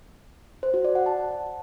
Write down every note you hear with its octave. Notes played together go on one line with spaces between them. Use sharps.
C5
F#4
D5
F#5
A5